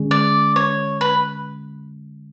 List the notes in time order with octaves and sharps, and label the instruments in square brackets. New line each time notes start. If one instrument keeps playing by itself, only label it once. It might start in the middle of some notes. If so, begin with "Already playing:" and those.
Already playing: [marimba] D3 G#3 C#4 G#4
[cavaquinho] D5
C#5
B4